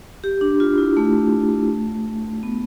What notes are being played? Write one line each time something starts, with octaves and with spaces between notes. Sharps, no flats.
G4
D4
F4
E4
A3
B3